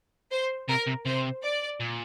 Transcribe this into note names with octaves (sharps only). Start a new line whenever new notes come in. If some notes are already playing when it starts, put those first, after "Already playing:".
C5
C3 A#4
C3
C3 C5
D5
A#2